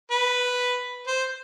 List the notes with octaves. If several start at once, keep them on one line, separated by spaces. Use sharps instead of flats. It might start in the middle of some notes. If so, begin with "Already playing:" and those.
B4
C5